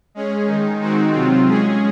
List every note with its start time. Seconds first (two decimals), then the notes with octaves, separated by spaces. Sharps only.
0.15 G#3 C#4 G#4
0.47 D#3 G#3 D#4
0.80 D#3 G#3 C4 D#4 F#4
1.13 C3 F#3 C4 F4
1.46 G#3 C#4 G#4